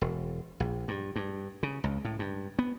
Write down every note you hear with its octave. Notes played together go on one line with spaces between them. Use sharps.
E1
A#1
G2
G2
C#3
C#2
A2
G2
B3